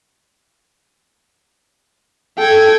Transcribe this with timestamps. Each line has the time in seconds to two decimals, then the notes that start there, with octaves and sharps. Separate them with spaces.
2.38 A4 G5 G#6